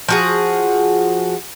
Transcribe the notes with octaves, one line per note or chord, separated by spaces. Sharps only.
F3 F#4 G#4